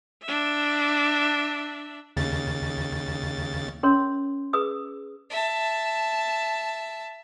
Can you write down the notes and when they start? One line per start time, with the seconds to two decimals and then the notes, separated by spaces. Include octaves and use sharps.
0.23 D4 E5
2.17 D#2 C#3 A6
3.83 C#4 A#4 C#5 C6
4.53 G#4 B4 D#6 E6
5.30 E5 A5